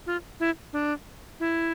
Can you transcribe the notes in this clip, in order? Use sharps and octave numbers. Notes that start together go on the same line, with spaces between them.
F4
E4
D4
E4